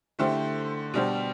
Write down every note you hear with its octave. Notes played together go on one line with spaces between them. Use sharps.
D3 A3 E4 G4 C5
B2 G3 D4 G4 C5